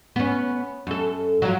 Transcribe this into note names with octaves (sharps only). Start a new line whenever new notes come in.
B3 C#4
F#2 A4
F3 F#3